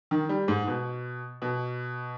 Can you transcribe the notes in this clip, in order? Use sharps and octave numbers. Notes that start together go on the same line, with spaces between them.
D#3
G3
G#2
B2
B2